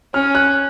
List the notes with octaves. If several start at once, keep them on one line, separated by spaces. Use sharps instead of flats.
C#4 F6
F#6